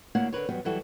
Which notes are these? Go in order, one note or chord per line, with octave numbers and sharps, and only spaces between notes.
D2 A#3 E4 C#5 F5 F#5
D3 A#4 B4 C#5
E2 F#3 G3 B3
E3 F#3 G3 E4 F#4 A4